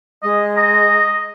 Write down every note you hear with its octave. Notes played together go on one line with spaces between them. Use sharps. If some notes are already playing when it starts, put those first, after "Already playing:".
G#3 D#5
D#5 A#5